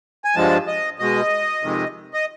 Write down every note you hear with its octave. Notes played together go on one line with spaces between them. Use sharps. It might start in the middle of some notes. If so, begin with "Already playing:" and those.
G#5
G2 D3 F3 G#3 A5
D#5
B2 G#3 D#5
F2 C3 D#3 G#3
D#5